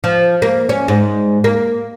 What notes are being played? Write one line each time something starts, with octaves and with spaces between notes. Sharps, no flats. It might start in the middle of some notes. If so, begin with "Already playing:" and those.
F3
A#3
C#4
G#2
A#3